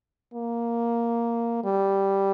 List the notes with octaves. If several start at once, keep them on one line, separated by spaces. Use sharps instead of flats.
A#3
G3